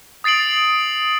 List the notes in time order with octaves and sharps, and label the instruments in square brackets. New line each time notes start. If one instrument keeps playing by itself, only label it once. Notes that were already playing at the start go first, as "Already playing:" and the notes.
[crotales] D#6 A6 C7 D7 F#7